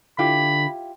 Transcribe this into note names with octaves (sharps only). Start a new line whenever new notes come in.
D3 E4 F4 G4 B5